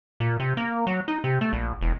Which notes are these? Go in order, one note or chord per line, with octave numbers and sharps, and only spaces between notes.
A#2
C3
A#3
F#3
D#4
C3
A3
A#1
E1